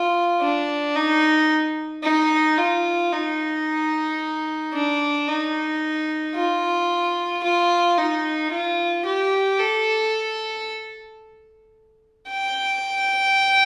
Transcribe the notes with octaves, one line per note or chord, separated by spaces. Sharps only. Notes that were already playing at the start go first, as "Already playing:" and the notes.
Already playing: F4
D4
D#4
D#4
F4
D#4
D4
D#4
F4
F4
D#4
F4
G4
A4
G5